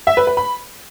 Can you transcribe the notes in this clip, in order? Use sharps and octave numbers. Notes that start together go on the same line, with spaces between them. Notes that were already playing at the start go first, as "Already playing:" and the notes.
E5
B4
B4
B5